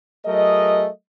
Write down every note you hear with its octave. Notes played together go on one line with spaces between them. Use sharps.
F#3 A3 G#4 A#4 D#5